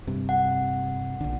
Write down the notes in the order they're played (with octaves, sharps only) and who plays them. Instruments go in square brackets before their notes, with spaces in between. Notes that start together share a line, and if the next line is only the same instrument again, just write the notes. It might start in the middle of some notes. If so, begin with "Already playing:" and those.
[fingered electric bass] G2 C3
[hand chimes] F#5
[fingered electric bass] A#1 D3